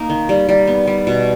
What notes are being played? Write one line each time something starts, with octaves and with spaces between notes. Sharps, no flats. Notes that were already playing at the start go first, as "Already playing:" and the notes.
Already playing: A#3 D#4
D#3
G3
G3
B3
G3
B2